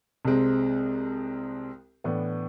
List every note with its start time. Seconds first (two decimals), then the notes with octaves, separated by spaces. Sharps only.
0.25 C2 C3 G#3 C4
2.04 A2 E3 B3 D4